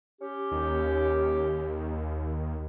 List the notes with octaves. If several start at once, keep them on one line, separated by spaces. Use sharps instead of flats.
C#4 G4
D#2